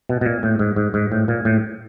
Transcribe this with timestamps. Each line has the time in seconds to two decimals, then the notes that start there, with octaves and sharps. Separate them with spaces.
0.09 B2
0.21 B2
0.26 A#2
0.43 A2
0.59 G#2
0.76 G#2
0.94 G#2
1.12 A2
1.28 A#2
1.45 A2